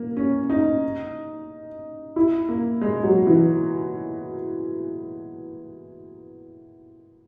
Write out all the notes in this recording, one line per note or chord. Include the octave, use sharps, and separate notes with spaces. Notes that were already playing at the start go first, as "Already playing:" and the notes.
Already playing: A#3
C#4
D#4
E4
A#3
G#3
F#3
E3